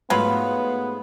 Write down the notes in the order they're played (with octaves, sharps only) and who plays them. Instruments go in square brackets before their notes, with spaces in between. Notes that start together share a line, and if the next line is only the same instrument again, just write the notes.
[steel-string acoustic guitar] G#2 G#3 A3 [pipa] F#3 F4 B4 [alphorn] B3